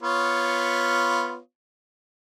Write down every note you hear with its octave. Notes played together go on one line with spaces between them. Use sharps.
B3 F4 C#5